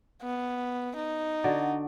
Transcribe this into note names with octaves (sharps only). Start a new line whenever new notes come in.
B3
D#4
D3 F#4 D5